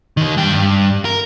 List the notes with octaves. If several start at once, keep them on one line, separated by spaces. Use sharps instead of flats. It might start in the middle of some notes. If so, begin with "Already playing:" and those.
D#2 D#3
G2 G5
G2
A#4